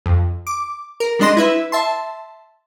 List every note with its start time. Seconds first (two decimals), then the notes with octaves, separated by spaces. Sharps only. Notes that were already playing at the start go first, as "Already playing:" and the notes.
0.06 F2
0.47 D6
1.00 A#4
1.19 G3 G#3 D4 D#5 C6 A#6
1.37 E4 B4 E5
1.72 E5 A5 C6